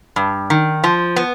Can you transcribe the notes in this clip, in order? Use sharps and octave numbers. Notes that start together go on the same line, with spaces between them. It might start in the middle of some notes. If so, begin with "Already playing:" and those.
G2
D#3
F3
B3